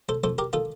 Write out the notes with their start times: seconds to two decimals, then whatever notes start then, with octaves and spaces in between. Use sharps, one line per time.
0.09 A4 C5
0.24 F2 A4 C5
0.38 G4 A#4
0.53 D#3 F4 A4